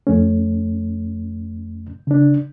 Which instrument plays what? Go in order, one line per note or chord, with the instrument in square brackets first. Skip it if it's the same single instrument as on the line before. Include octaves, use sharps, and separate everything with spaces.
[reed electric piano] F2 A3 C#4
C#3 D4